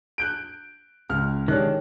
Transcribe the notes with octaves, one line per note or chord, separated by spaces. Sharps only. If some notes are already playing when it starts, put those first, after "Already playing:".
F#6 G6 D7
C#2 F6
D#3 G#3 D4 G4 C#5 F#6